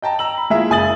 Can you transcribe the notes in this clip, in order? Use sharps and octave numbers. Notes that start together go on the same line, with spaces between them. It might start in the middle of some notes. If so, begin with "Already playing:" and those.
D#5 G5 A5 A#5
A#5 E6 F#7
B5
G#3 A#3 E4 F4 G#4 E5
F#1 G#5 D#6 A6 F#7